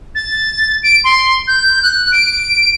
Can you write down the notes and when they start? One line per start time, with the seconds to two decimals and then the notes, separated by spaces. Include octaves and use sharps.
0.15 A6
0.83 D7
1.04 C6
1.48 G6
1.83 F#6
2.12 D7